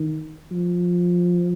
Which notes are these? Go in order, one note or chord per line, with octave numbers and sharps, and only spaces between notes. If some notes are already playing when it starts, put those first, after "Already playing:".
Already playing: D#3
F3